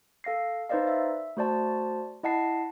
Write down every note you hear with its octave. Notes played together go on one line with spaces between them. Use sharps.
A4 F5 A#6 C7
D#4 B4 C5 D5 D#5 F5
E5
A3 F#4 C5 D5 A5
E4 D#5 F#5 A5 C7